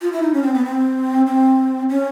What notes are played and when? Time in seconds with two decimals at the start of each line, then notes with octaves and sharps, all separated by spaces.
0.02 F4
0.12 E4
0.22 D#4
0.33 C#4
0.43 C4
0.54 B3
0.65 C4
1.27 C4
1.89 C#4